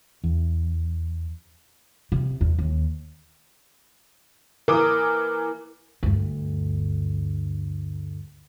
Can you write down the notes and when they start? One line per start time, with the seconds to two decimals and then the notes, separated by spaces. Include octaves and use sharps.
0.24 E2
2.12 C3
2.41 E2
2.59 D#2
4.68 E3 A#4 D6 D#6
6.03 D2 G2